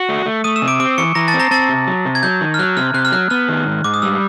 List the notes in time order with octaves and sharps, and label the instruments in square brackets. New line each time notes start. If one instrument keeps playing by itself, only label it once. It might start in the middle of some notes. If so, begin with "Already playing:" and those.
Already playing: [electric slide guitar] F#4 [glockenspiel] C#6 C#7
[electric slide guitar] A3
A3
[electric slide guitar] A3 [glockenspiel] D#6 D#7
[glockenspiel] E6 E7
[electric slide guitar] C3
[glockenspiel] D6 D7
[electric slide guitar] C4 [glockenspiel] D6 D7
[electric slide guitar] E3 [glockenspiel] C#6 C#7
[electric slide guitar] E3 [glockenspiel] A#5 A#6
[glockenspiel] A5 A6
[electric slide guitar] C4
[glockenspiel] A#5 A#6
[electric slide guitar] C4 [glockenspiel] A5 A6
[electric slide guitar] C3
F#3
C3
[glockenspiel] G#6
[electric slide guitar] F#3 [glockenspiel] G6
[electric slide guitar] D#3
[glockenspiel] F6
[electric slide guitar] F#3 [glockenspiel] F#6
[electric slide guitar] C3 [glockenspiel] F6
[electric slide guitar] C3 [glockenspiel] F#6
[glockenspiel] F6
[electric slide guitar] F#3 [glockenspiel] F#6
[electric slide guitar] B3 [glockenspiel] F6
[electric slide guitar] D#3
G#2
[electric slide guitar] G#2 [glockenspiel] D6
[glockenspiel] D#6
[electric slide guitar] G3 [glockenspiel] E6